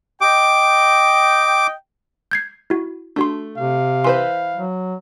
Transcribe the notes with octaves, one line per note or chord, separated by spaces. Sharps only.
D#5 G5 D6
G6 G#6 C7
E4 F#4
A3 D4 F#4 C6
C3 F5
E3 B4 C5 C6
F#3